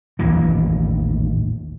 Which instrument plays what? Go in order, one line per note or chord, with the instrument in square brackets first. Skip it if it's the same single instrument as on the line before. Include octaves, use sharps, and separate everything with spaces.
[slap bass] A1 D#2 A#2 E3